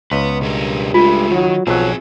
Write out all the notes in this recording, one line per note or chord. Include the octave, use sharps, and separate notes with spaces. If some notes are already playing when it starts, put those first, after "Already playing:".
C#2 B3 B4
G2 B2 G#4 A#4
G#3 A3 F4
D#3 F#3
B1 F3 F#3 C4 G#4